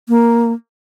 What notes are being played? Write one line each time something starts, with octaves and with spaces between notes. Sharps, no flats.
A#3